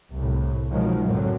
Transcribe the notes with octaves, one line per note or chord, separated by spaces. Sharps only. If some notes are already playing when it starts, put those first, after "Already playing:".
C2 A2
B2 D#3 F3 F#3 G#3
F#2 A2 D3 F#3 C4